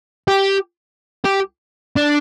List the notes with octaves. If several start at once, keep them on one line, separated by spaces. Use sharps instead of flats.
G4
G4
D4